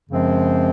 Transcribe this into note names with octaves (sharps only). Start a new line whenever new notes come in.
F#2 C#3 F3 G#3 C4